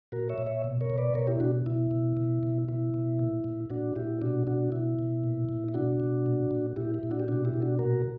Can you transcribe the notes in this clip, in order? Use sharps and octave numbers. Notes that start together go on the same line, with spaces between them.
A#2 F#4 A#4
C#5 E5
A#2
C#5 E5
B2
A#4 C#5
B2
B4 D5
B2 A#4 C#5
E4 G4
B2 D4 F#4
B2 E4
B2
B2
B2
B2 E4
B2
A#2
A#2
A#2 D4 F#4
A#2 E4 G4
B2 D4 F#4
B2 D4 F#4
B2 E4
B2
A#2
A#2
E4
B2 D4 F#4
B2
A#2
A#2
A#2 E4 G4
E4
A#2
D4 F#4
G4
B2 D4 F#4
E4 G4
B2
D4 F#4
A#2 F#4 A#4